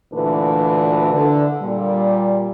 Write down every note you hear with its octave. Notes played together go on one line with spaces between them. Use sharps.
D2 A#2 E3 D4 B4
D3
A#2 G3